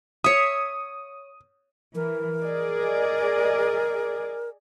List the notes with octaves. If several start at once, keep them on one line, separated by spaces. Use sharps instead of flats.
C#5 E5 D#6
E3 A#4
G#4 D5 D#5